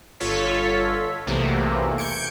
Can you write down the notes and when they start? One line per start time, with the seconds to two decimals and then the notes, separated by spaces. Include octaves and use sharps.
0.20 G1 F4 A4 C#5 B6
1.27 B1 E2 C3 A3 A#3
1.98 G6 G#6 C#7 D7